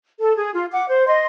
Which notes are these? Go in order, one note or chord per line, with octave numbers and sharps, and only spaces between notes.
A4
G#4
F4
F#5 D6
C5
D#5 C6